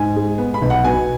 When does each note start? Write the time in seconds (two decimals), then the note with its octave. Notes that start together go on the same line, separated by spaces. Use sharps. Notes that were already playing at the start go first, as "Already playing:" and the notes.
Already playing: G#2 G#5
0.16 G#3
0.38 B3
0.54 B5
0.62 B1
0.70 F#5
0.84 B2 G#5